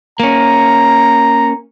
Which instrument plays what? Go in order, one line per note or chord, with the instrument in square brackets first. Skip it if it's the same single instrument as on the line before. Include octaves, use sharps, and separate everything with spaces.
[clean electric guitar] A#3 C#4 [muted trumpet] A#5